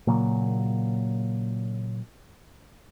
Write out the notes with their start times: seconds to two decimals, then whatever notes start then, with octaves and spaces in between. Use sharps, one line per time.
0.07 A#2 C#3 F#3 A#3